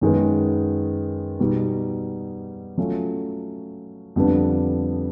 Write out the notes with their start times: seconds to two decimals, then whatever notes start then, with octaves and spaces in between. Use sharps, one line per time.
0.01 F#2 D#3 G#3 B3
1.39 B2 G3 B3 D#4 F#4
2.78 F#3 A3 C#4 F4
4.16 F2 D3 G3 B3 D4